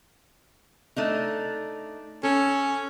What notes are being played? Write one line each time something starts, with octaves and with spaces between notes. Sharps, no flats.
A3 D4 D#4
C#4 A4